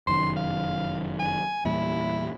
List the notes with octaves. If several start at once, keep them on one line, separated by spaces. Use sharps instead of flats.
F1 F#2 D#3 C6
F5
G#5
E2 A#2 G3 E4